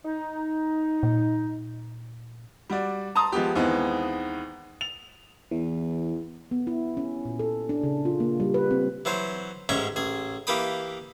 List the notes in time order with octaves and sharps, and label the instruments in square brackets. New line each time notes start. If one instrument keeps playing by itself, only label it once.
[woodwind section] D#4
[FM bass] A#2
[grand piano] G3 F#4 D5
A5 A#5 C6 D#6
F3 G#3 B3 G4
D#2 D#3 E3 G#3 B3 C4
F7
[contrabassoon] E2 [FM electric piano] E3
[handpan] B3
E4
C#4
A#2
A4
D4
C#3
F4
A#3
G3
B4
C4
[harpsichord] E3 F#3 C5
A1 G#2 G#3 C#4 E5 A#5
A1 G#4
E3 A#3 G4 B5 D#6